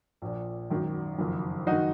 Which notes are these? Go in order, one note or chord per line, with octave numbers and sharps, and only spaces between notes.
A#1 A#2
G#1 F#2 D#3
F#1 F2 D#3
F#1 D#3 D#4 F#4